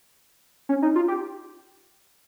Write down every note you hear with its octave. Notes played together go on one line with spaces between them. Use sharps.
C#4
D#4
F4
G4